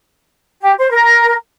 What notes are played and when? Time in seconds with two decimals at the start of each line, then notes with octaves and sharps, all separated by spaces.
0.61 G4
0.79 C5
0.90 A#4